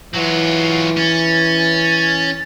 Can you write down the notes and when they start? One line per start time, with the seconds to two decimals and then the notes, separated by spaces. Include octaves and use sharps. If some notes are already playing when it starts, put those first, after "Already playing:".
0.15 E3 F#3 F4 F#5
0.97 C#4 A6